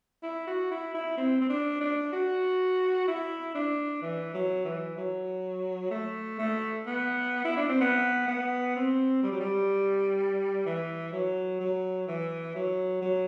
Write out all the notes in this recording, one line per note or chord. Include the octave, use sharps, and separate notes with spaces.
E4
F#4
E4
E4
C4
C4
D4
D4
F#4
E4
D4
E3
F#3
E3
F#3
A3
A3
B3
E4
D4
C4
B3
B3
C4
G3
F#3
G3
E3
F#3
F#3
E3
F#3
F#3